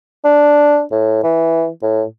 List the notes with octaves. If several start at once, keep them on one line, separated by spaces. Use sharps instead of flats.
D4
A2
E3
A2